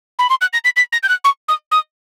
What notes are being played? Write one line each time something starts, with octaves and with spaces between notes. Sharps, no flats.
B5
C6
F#6
A#6
B6
B6
A#6
G6
F#6
C#6
D#6
D#6